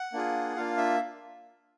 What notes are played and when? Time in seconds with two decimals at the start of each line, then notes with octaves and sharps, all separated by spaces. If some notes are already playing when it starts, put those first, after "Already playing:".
Already playing: F#5
0.13 A#3 D4 F4 G#4
0.56 A#3 D4 F4 F5
0.77 E5